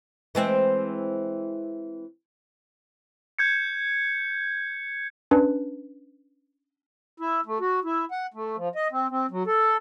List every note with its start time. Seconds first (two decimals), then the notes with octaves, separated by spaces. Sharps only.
0.35 E3 G#3 C4
3.39 G6 G#6 C#7
5.31 C#4 D4 B4
7.20 E4
7.46 A3
7.60 F#4
7.84 E4
8.11 F#5
8.34 A3
8.57 F3
8.75 D#5
8.91 C4
9.10 C4
9.31 F#3
9.47 A4